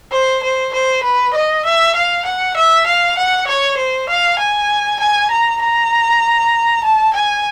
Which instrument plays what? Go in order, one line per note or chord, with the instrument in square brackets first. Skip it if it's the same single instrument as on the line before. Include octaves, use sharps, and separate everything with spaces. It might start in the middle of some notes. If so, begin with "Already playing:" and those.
[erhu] C5
C5
C5
B4
D#5
E5
F5
F#5
E5
F5
F#5
C#5
C5
F5
G#5
G#5
A#5
A#5
A5
G#5